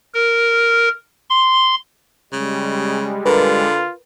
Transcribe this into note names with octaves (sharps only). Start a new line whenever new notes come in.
A#4
C6
C#3 G3 G#3
D3 F4 A#4 B4